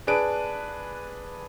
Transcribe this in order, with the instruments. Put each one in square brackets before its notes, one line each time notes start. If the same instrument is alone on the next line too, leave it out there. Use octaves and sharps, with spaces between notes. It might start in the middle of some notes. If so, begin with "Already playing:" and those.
[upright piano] D4 G#4 B4 D7